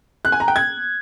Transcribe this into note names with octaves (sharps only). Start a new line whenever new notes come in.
F#6
G#5
A#5
G5
G#6